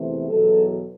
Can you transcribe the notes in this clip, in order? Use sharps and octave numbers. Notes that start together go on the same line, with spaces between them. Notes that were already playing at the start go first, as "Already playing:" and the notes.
Already playing: E2 C3 E3 A3
E2 B2 F#3 A4